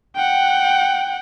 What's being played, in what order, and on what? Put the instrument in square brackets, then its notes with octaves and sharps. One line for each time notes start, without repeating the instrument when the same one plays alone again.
[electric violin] F#5 G5